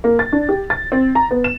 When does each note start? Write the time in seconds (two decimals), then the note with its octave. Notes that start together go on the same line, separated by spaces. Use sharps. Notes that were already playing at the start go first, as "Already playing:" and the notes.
0.04 A#3
0.19 A6
0.32 D4
0.49 G4
0.70 A6
0.92 C4
1.15 A#5
1.31 B3
1.44 E7